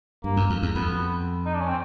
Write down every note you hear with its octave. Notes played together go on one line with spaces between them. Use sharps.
G2 A#3
F#2
F2
E2
F2 B3
D#4
D4
C#4
C4